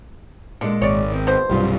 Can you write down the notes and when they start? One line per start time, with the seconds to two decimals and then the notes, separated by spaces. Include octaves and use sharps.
0.61 A#2 D3 G#3
0.81 G#1 C#5 D5
1.11 D#3 C4
1.27 B2 C5
1.49 B1 G2 C3 G3 F4